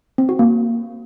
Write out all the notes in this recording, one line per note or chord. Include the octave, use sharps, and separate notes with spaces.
C4
F#4
A#3